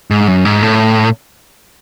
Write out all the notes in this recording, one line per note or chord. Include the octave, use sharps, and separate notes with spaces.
G#2
F#2
G#2
A2